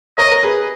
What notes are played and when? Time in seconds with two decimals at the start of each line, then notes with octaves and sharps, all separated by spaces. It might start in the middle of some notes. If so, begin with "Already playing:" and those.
0.18 A#4 C#5 D#5
0.32 A#4
0.43 G#4 B4